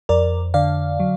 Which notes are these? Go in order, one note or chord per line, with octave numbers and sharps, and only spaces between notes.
F2 A#4 D5
D3 D5 F5
F#3